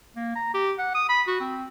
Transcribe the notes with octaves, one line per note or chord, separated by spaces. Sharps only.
A#3
A#5
G4
F#5
D#6
B5
F#4
C4